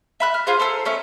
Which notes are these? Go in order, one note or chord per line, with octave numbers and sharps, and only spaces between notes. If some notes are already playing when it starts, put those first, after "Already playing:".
E5 B5 F#6
F6
F4 G#4 C5
A4 C5 A#5 E6
A3 C#4 E5